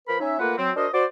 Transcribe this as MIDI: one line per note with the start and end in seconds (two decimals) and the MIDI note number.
0.08 0.15 53
0.08 0.15 70
0.08 0.15 71
0.08 0.15 83
0.20 0.37 61
0.20 0.37 63
0.20 0.37 73
0.20 0.37 76
0.39 0.56 57
0.39 0.56 58
0.39 0.56 65
0.39 0.56 70
0.39 0.56 71
0.39 0.56 78
0.57 0.70 54
0.57 0.70 60
0.76 0.87 62
0.76 0.87 66
0.76 0.87 70
0.76 0.87 72
0.76 0.87 75
0.93 1.04 66
0.93 1.04 72
0.93 1.04 74